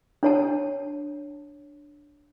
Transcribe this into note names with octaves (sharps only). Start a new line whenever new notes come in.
D4 C#5 A5